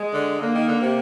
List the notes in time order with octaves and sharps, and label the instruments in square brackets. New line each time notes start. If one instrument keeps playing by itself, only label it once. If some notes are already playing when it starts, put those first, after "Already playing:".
Already playing: [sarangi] G#3
[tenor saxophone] D3
[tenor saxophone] D3 [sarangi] A#3
[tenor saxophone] D#3
D3
C3